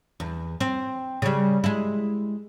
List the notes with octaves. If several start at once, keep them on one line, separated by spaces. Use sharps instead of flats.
E2
C4
C#3 G3
G#3 E4